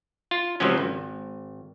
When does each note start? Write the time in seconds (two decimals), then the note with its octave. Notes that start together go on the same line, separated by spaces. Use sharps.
0.31 F4
0.60 C#2 C3 F3 F#3 C#4
0.78 G#1